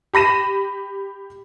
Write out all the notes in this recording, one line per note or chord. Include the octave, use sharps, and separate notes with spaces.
G4 B5 A#6 D#7 E7